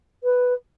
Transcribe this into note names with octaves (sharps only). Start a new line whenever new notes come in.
B4